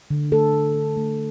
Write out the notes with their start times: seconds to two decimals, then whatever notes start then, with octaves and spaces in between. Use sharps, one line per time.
0.10 D3
0.32 A3 A4
0.53 A3
0.76 D4
0.97 A3